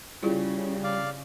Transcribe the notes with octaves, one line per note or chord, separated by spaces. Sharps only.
C#3 G3 E4 F4 G#4
D5 F5